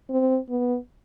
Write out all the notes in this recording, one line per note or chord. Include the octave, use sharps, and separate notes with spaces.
C4
B3